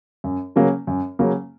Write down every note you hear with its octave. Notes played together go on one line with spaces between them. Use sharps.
F#2
C#3 F#3 A#3 C#4
F#2
C#3 F#3 A#3 C#4